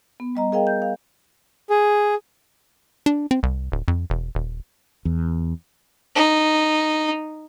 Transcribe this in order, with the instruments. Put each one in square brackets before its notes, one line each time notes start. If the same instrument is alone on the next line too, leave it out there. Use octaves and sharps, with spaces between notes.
[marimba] B3
G3 D#5 A#5
G#4 A#4 D#5 F5 G5
G6
F5
[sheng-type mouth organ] G#4
[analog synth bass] D4
C4
C2
D1
F2
E1
D#1
[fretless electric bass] E2
[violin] D#4